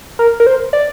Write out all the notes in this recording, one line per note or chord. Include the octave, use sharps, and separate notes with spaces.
A#4
A#4
C5
D5